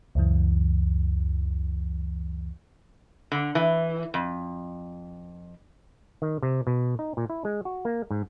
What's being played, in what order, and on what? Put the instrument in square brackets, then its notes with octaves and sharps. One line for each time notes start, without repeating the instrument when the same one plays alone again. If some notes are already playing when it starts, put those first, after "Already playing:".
[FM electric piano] C#2 F#2 E3
[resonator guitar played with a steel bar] D3
E3
F2
[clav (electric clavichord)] D#3
C3
B2
D#4
A#2
E4
G#3
F#4
A#3
G#2